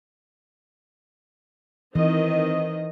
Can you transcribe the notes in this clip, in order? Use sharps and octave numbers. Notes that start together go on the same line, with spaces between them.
D#3 E3 C4 D#5